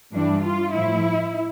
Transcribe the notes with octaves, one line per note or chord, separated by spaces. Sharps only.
G2 E3 G3 D4
F4
A2 F3 E4